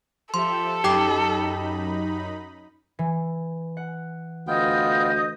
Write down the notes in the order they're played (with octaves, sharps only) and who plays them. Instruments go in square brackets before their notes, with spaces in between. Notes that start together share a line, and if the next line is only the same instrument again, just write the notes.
[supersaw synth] F3 G4 E5 [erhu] A4 [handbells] C6
[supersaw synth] F#2 D#4 B5 [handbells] G4 G5 D6
[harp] E3
F#5
[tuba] D2 [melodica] B3 F4 G5 [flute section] D#5 D#6 G6